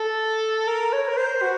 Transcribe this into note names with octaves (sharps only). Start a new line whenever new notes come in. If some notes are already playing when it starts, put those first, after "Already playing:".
Already playing: A4
A#4
C#5
A#4
C5
F#4